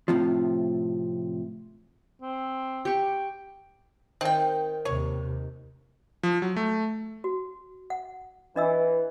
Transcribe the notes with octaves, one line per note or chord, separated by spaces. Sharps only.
A2 C3 F3
C4
G4 G5 C#6
D#3 C4 G5
D#2 C3 C#5
F3
F#3
A3
F#4
F#5
E3 D4 D#5 E6